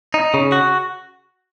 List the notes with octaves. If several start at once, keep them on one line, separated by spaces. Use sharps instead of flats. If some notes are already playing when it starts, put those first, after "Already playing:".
D#4
C#3
F#4